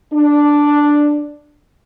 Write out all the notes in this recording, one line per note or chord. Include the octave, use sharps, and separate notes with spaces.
D4